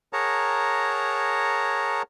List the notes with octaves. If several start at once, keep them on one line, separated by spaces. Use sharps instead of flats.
G#4 A#4 C#5 F#5 A5 A#5